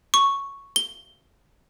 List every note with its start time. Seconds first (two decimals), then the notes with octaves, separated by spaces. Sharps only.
0.14 C#6
0.76 G7